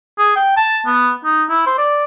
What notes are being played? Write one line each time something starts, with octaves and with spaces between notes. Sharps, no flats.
G#4
G5
A5
B3
D#4
E4
C5
D5